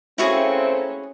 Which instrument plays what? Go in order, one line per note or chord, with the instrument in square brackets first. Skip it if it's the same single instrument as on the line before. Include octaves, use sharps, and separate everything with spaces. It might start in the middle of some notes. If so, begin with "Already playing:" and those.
[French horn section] A3 A#3 C4 [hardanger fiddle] C#4 [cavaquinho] E4 F#4 G#4